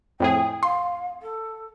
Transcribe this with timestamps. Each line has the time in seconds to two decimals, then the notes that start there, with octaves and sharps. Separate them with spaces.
0.20 F2 A2 G#4 G5
0.63 F5 C6
1.22 A4